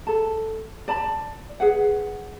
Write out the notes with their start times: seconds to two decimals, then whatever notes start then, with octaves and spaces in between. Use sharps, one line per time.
0.07 A4 A5
0.88 D5 A5 B5
1.60 G#4 B4 F#5